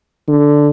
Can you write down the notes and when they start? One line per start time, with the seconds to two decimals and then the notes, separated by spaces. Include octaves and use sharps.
0.28 D3